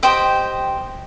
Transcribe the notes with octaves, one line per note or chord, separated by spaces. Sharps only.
G4 C5 D#5 G5